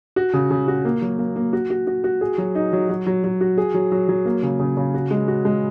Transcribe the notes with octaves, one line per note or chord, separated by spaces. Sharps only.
F#4
C#3
C#3
F#4
A#3
F#3
A#3
A#3
F#4
F#4
F#4
F#4
G#4
F#3
D#4
F#3
F#3
F#3
F#3
F#4
G#4
F#3
F#3
F#3
A#3
C#3
C#3
C#3
F#4
G#3
F#4
G#3